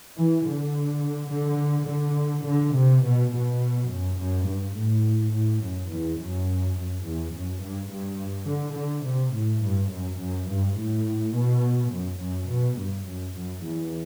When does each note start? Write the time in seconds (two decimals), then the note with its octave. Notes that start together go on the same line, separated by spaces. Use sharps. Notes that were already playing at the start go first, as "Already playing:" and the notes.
0.17 E3
0.46 D3
1.32 D3
1.89 D3
2.47 D3
2.75 C3
3.04 B2
3.32 B2
3.89 F#2
4.18 F#2
4.47 G2
4.76 A2
5.32 A2
5.62 F#2
5.90 E2
6.18 F#2
6.77 F#2
7.05 E2
7.33 F#2
7.62 G2
7.90 G2
8.48 D3
8.76 D3
9.05 C3
9.34 A2
9.62 G2
9.92 F#2
10.20 F#2
10.49 G2
10.77 A2
11.35 B2
11.91 F#2
12.21 F#2
12.50 B2
12.78 G2
13.06 F#2
13.35 F#2
13.64 E2